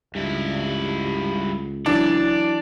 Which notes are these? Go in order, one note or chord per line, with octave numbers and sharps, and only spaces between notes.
C#2 G2 E4
E3 F#3 D4 D5